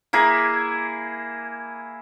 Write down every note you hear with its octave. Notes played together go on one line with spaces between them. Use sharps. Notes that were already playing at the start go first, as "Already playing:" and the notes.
A#3 E4 G#4